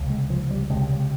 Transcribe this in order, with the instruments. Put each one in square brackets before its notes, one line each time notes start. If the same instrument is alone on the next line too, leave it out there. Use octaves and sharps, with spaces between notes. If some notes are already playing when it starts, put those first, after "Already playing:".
Already playing: [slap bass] C#2 C3
G#3
F3
G3
C#2 C3 G#3